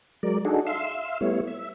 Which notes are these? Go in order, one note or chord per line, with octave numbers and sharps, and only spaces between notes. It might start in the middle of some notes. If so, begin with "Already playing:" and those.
F#3 G#3 A#4 D5
D4 D#4 F#4 G#4 A4
E5 F5 C6 E6
G3 A3 B3 E4 C#5
E5